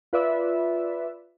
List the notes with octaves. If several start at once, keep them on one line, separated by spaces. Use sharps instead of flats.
F4 B4 D5 E5